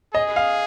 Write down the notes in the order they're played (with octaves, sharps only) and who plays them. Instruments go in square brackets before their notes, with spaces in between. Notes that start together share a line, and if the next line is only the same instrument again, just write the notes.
[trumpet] G#4 [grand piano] D#5
[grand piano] F5